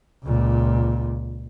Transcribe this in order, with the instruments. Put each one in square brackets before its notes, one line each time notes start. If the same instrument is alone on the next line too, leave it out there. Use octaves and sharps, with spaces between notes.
[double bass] C#2 A#2